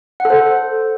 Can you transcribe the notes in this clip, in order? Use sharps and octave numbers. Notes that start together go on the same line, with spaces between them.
F#5
A4
C5